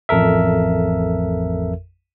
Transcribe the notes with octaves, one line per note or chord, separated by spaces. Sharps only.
A1 F2 A4 A#4 E5